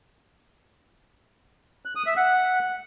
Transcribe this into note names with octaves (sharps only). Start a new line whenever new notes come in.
F#6
D#6
E5
F#5